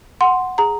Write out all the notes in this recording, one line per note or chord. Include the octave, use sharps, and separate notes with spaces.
F#5 C6
G#4 A#5